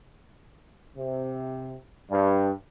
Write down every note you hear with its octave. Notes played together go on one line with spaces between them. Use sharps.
C3
G2